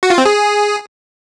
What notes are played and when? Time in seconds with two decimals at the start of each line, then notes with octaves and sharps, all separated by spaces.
0.03 F#4
0.10 F4
0.18 C4
0.25 G#4